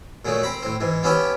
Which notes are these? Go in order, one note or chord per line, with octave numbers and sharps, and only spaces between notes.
A#2 F#3 G#3 A3
C4 A#5 B5
A2 C4
G#2 E3
B3 C#4 E4 G4 G5